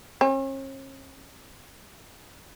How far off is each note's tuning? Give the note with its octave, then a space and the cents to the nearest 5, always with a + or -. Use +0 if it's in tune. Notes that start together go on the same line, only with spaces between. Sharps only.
C#4 -45